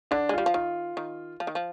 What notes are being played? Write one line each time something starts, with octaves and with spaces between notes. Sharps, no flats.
D3 D4
G#3
G3 F4
F3
D#3 F4
D#3
F3
D#3
F3